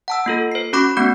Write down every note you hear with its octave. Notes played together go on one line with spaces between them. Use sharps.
F#5 A5 E6
A#3 F4 A4
C5 C7
C#4 F#4 B5 C#6 D6
A3 B3 C#4 F#4 F#5 G6